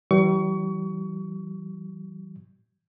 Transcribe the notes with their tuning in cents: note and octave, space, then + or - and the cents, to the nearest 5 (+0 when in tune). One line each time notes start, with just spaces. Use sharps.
E3 +0 G3 -45 C#6 +30